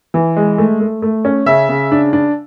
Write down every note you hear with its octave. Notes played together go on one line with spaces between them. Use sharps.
E3
G#3
A3
A3
A3
C#4
C#3 E5
C#3
D4
D4